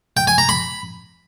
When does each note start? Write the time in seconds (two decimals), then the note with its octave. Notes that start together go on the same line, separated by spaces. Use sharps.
0.17 G5
0.27 G#5
0.38 A#5
0.49 B5